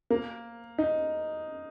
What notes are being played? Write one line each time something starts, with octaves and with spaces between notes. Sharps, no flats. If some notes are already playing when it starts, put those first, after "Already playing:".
A#3
D#4